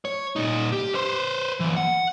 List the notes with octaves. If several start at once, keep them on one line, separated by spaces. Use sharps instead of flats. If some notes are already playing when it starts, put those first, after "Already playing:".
C#5
A#2 D#4
G4
B4 C5
E3 A#3
F#5